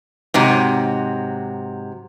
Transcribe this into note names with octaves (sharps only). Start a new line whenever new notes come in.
G#2 C3 F#3